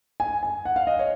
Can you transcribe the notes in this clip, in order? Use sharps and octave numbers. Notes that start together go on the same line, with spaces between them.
G#5
G#5
F#5
F5
D#5
C#5